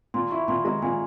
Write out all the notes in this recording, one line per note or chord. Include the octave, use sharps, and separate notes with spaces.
A#2 C6
E4 C#6
A#2 C6
G#3 A#5
A#2 G#5